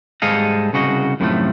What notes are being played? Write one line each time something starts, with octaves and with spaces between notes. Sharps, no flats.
G#2 G3 G#4 A4 D#5 F5
C2 C#3 F#4 D#5
F#2 A2 C3 D#3 F3 A3